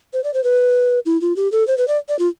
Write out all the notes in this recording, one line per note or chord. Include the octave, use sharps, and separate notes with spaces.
C5
D5
C5
B4
E4
F4
G4
A4
C5
B4
D5
D5
F4